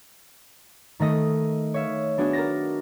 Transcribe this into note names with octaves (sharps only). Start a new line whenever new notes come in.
D#3 A3 D#5
C#5 E5 F5
B3 D4 F#4 G#4
A#4 A6 A#6